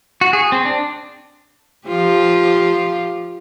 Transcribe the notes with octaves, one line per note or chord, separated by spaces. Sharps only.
F#4
G#4
C4
D4
F3 F4 G4